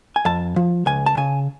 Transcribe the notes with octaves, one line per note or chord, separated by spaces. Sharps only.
G#5
F2 A5
F3
C#2 G#5
A5
C#3 G#5